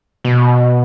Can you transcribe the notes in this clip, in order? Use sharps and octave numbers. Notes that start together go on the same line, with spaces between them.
B2